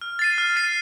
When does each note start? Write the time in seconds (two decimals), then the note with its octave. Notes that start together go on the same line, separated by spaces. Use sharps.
0.01 F6
0.19 A6 C7 D#7
0.38 F6
0.56 A6 C7 D#7